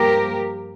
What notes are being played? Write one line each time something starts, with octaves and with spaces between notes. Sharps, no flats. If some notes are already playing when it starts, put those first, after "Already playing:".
Already playing: G2 F3 A#3 G4 A#4